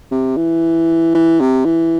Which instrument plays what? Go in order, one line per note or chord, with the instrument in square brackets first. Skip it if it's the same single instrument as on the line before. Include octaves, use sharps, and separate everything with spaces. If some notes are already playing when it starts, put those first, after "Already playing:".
[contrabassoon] C3
E3
E3
C3
E3